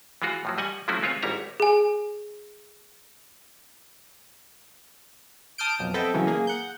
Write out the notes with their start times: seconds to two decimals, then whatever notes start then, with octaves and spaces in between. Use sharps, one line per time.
0.22 E3 G#3 F4 F#4
0.45 A2 F3 F#3
0.58 G3 D#5 F#5 G#5
0.88 F3 F#3 A3 C#4 E4 F#4
1.02 G#3 C4 F4 B4 C#5 E5
1.23 G#1 G#2 G3 E4 C#5 A#5
1.60 G#4 G#5
5.58 A5 D#6 F6 G6 D7
5.79 B1 F2
5.94 B3 C4 A4 D#5 E5 G5
6.14 C#3 E3 F#3 C#4
6.27 A#3 G#4
6.47 F#5 G6